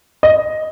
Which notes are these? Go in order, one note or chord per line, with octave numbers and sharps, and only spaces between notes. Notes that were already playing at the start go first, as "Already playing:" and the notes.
D#5